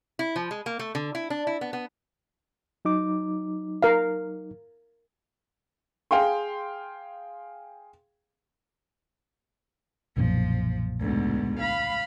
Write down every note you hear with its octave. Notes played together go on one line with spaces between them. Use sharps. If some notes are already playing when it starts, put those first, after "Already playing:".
E4
F3
G#3
A#3
A3
D3
E4
D4
E4
B3
B3
F#3 D#4 D6
A#4 F5
G#4 F5 G5 C6
B1 F#2 A#2 F3
D2 G#2 B2
F5 B5